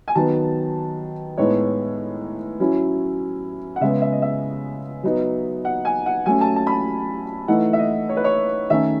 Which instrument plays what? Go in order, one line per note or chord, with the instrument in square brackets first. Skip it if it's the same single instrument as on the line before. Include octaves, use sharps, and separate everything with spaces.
[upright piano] G#5
[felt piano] D#3 F#3 B3 [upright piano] A5
[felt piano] A2 G#3 B3 D#4 [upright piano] C#5
[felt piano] F#3 C#4 E4
[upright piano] F#5
[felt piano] C#3 G#3 B3 [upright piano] E5
[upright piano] E5
D#5
E5
[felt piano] F#3 B3 D#4
[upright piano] F#5
G#5
F#5
[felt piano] F#3 A3 C#4 [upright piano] G#5
[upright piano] A5
A5
B5
A5
[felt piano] E3 A3 D#4 [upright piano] F#5
[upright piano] E5
D#5
C#5
B4
C#5
[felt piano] D#3 A3 C#4 [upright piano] E5